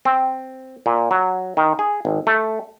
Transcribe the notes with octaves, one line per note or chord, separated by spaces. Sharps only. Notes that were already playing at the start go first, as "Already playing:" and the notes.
C4
A#2
F#3
D#3
G#4
G#1
A3